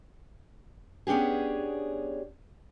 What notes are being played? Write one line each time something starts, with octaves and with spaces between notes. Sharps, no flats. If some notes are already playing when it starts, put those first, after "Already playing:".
B3 C#4 D4 G4 G#4